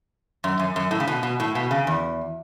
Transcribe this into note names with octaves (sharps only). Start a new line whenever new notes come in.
F#2
F#2
F#2
A2
C#3
B2
B2
A2
B2
C#3
E2